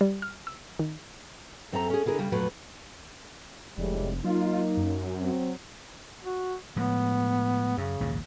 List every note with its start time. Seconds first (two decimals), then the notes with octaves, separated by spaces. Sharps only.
0.01 G3
0.22 F6
0.47 E6
0.79 D#3
1.72 F#2 C4 A4 E5 G#5 A#5
1.90 C#4 G#4
2.06 D3 E4 G#4 A#4
2.19 C#3 G3
2.32 F2 A#2 F#3 A3 B4
3.78 F1 A2 G3 G#3
4.25 F#3 A#3 D#4 F4
4.77 F#2
5.21 F#3 C4
6.24 F#4
6.76 A2 F3 G#3 B3
7.78 F#2 C#3
8.00 A#1 D#2 G#2